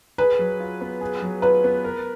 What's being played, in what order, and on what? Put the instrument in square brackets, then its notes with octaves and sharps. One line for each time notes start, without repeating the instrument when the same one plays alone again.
[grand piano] G#4 [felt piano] B4
[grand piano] F#3
F4
B3
G#4
F#3
[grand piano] F4 [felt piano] B4
[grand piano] B3
A#4